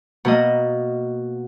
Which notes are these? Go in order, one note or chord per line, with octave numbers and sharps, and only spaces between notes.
B2 A#3 D#5